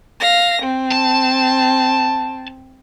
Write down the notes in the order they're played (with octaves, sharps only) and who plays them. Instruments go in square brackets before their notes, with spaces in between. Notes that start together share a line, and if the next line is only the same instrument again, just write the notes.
[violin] F5 A#6
C4
[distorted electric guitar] A5